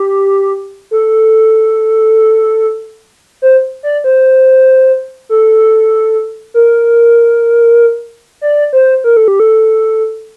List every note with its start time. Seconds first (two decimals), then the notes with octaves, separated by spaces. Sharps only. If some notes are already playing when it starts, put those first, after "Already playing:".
Already playing: G4
0.91 A4
3.42 C5
3.83 D5
4.04 C5
5.29 A4
6.54 A#4
8.41 D5
8.73 C5
9.04 A#4
9.17 A4
9.28 G4
9.40 A4